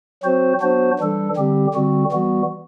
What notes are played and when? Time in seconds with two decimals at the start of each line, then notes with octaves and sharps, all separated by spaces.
0.23 F#3 C4 F#4 C5
0.61 F#3 B3 D4 F#4 C5
0.99 E3 G3 D4 A4
1.36 D3 G3 C4 G4
1.74 D3 G3 C4 F#4
2.12 E3 G3 B3 F#4